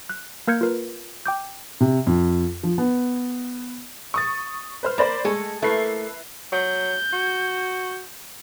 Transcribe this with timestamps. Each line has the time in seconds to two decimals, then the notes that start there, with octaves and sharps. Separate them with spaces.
0.09 F#6
0.47 A#3 A#4 F6 G6 G#6 C#7
0.61 F4 A#4 B4
1.26 G5 D6 G6
1.81 C3
2.07 F2
2.63 F3
2.78 B3
4.14 C#6 D#6 A6
4.83 B4 C5 F6
4.98 A#3 C5 D5 B5
5.25 G#3 A3 G#4 A4
5.62 A3 A#3 E4 B4 C7
6.52 F#3 G6
7.13 F#4